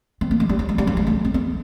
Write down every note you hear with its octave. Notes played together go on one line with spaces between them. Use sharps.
C4
A#3
G#3
G3
F#3
G#3
G3
F#3
G#3
A3
C4
B3